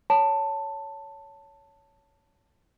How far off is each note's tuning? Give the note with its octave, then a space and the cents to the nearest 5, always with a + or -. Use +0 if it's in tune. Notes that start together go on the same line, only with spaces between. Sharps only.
C#5 +15 A5 +10